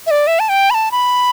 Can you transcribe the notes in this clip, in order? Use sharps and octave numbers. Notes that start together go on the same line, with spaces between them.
E5
D5
E5
A5
G5
B5
A5
B5